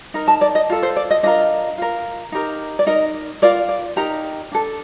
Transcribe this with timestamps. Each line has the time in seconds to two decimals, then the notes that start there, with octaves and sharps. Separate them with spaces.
0.14 D#4 A#4
0.28 A5
0.41 D5
0.55 D#5
0.70 F4 A4
0.83 C5
0.96 D5
1.11 D#5
1.23 D4 F4 A#4 D#5
1.78 F4 A#4
2.32 D#4 G4 A#4
2.79 D5
2.87 D#4 A#4 D#5
3.42 F4 A#4 D5
3.69 D5
3.96 D#4 G4 A#4 A#5
4.52 D4 A4